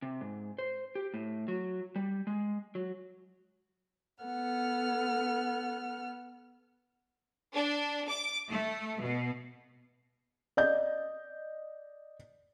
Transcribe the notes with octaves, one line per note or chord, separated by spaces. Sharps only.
C3
G#2
C5
G4
A2
F#3
G3
G#3
F#3
B3 A4 F#5 F6
D4
D6
A3
B2
D5 D#5 G6